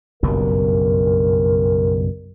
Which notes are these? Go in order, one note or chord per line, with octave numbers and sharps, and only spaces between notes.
F#1 B1 G2 A#4